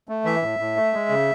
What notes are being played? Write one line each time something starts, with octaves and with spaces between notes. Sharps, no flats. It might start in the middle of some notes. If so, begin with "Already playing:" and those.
A3
E3 E5
A2
A2
A3
G#3
C#3